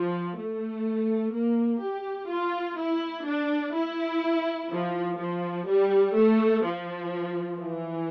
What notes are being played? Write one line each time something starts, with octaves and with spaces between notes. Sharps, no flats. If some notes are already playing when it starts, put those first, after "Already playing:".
Already playing: F3
A3
A#3
G4
F4
E4
D4
E4
F3
F3
G3
A3
F3
E3